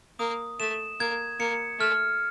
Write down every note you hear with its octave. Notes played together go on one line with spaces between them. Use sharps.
A#3 D#6
A3 E7
A#3 G#6
A#3 C#7
A3 F6